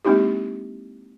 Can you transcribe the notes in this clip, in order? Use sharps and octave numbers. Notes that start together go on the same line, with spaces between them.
G#3 A#3 C4 D#4 E4 G4